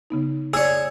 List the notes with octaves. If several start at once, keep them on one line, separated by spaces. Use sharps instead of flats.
C#3 B3 D#4
G#4 C#5 D5 E6